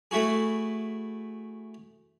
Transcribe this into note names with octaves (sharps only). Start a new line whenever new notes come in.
A3 E4 F#4 G#4